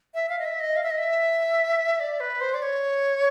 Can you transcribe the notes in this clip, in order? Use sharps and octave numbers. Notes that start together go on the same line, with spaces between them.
E5
F5
D#5
E5
D#5
F5
E5
D#5
E5
D5
B4
C5
D5
C#5